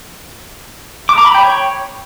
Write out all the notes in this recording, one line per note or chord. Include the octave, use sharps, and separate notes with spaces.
D6
A#5
B5
G5
C#5